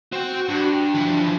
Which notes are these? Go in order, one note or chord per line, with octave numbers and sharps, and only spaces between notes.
C4 F#4 G5
G2 D4
E3 F3